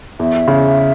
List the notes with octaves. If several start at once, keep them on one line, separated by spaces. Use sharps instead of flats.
E2 E5
C#3